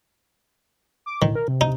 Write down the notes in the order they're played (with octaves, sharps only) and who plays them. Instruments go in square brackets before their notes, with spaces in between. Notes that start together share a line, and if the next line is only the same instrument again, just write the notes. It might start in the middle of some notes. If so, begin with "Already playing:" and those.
[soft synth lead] D6
[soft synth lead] A2 [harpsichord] D#3
[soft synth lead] A#4
C3
[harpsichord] D#4